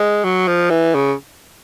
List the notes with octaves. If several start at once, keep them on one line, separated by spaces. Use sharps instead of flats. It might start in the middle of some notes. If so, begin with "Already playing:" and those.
Already playing: G#3
F#3
F3
E3
C#3